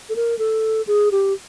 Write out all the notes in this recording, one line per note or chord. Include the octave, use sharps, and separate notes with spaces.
A4
A#4
A4
G#4
G4